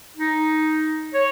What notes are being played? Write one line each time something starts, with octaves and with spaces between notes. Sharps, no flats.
D#4
C#5